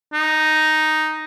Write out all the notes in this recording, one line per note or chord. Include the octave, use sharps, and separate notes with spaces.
D#4